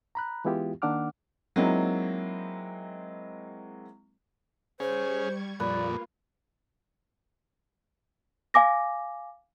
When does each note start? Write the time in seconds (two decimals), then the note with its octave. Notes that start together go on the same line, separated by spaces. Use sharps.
0.15 A#5 B5 F#6
0.45 E3 G#3 B3 E4 F4 G4
0.82 D#3 A#3 D4 F#5 D6 F6
1.56 F#3 G#3 A#3 C4 D#4 E4
4.80 G3 C#4 G#4 C5 C#6 G#6
5.60 F2 A#2 A#3 F4 B4 D5
8.54 F5 G#5 D6 A#6